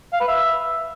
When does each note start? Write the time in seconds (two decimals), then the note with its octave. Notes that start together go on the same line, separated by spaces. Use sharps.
0.13 F5
0.20 B4
0.28 E5